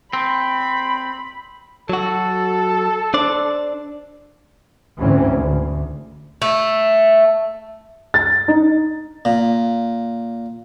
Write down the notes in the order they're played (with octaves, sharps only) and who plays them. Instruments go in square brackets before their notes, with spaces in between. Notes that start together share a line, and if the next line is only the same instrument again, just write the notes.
[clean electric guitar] C4 [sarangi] B5
[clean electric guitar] F#3 F#4 [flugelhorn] A4
[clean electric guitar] D4 C5 D5
[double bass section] D2 G#2 E3 C4 C#4
D2
[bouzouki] A3
[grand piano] A6
D#4
[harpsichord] A#2